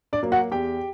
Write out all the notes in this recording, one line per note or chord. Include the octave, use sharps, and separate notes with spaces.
D4 D5
F#3 A#3
F#4 F#5
E2 G4 G5